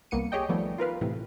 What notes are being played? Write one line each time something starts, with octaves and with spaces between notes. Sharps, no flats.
C2 A#3 B3 C#7 D#7
G4 G#4 C#5 D#5 G5
D#3 F3 G3 A3 B3
F4 A#4 B4 F5
A2 C3 E3